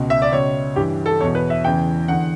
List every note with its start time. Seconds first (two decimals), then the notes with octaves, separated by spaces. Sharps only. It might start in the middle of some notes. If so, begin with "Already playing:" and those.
Already playing: C#2 B2
0.10 E5
0.22 D5
0.32 C#2 B2 C#5
0.76 G2 E3 G4
1.06 A4
1.20 E2 C#5
1.25 B2
1.35 B4
1.50 E5
1.64 E2 C#3 E3 G5
2.08 E2 D3 F#5